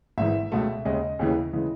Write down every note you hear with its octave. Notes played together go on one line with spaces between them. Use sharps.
G#1 G#2 E3 E5
C#2 B2 A3
D#2 C#3 G#3 D#5
D#2 C#3 E3
C#3 E3 G#3